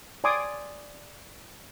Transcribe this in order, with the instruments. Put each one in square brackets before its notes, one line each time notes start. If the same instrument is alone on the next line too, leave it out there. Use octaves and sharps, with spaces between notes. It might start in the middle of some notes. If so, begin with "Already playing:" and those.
[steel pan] D5 G#5 C6 D6 D#6